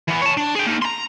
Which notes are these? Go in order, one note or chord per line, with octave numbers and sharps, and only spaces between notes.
E3 B3
C#5 A5
D4
G#4 G5
A#3 D#4
A#5 C6